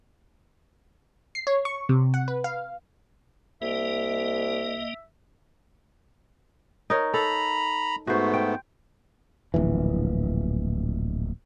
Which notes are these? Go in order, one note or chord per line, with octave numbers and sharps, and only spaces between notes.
C7
C#5
C#6
C3
F#5
B4
F5
C2 A#3 D#5 E5
D#4 A#4 C#5
A4 A#5 B5
G#2 A3 B3 F#4 C5
G5
D1 A#1 E3